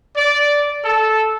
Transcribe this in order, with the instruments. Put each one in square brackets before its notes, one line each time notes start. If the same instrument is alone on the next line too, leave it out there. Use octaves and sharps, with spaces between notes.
[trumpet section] D5
A4